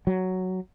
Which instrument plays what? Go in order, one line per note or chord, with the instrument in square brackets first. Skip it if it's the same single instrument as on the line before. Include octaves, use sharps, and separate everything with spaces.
[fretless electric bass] F#3